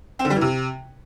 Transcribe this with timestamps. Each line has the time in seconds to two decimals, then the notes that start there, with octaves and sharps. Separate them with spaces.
0.19 C4
0.25 D3
0.30 G3
0.36 E3
0.41 C3